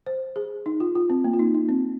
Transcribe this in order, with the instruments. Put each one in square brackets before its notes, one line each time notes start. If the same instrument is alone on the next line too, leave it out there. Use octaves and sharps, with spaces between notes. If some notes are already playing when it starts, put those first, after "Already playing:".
[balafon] C5
G#4
D#4
F4
F4
C4
A#3
F4
D#4
D#4
C4